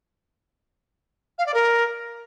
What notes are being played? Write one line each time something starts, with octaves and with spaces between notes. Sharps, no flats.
F5
D5
A#4